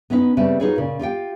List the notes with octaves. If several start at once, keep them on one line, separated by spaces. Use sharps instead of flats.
B3 C#4 D#4 B4
C#3 G3 A3 C4 B4
D#4 F4 F#4 G#4 B4 C#5
A#2 C#3
F4 G4 F5 G5